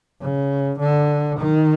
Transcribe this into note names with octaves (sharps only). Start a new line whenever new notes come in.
C#3
D3
D#3